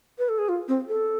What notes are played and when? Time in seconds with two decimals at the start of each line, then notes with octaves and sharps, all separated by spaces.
0.19 B4
0.29 A4
0.38 G#4
0.49 F4
0.68 C4
0.88 A4